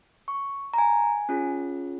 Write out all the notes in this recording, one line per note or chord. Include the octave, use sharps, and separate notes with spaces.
C#6
A#5
G#5
C#4 F4 G#4